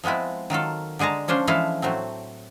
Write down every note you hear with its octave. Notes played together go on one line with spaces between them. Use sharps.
F3 G#3 B3 C4 E4
D#3 F#3 F4 A4
D3 G#3 G#4 A5 A#5
F3 C#4 D4 C5
E3 F3 G#3 E4 A4 F5
A2 F#3 A3 C4